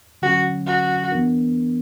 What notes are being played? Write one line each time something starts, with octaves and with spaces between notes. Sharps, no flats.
D3 F#3 C#4 F#4
F#4
E3 B3 D4 A#4